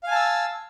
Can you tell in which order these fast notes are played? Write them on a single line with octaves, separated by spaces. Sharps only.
F5 G#5 A5 E6